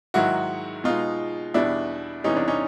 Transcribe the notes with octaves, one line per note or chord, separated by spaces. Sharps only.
G#2 D#3 F#3 E4 F#4
B2 G#3 D#4 F4
E2 B2 G3 D4 E4
E2 C3 E3 G3 C#4 D#4
D4
C#4 D#4